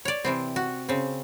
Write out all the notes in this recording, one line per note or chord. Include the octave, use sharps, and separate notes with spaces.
C#5 D5
C3 E3 C4
F#4
C#3 C4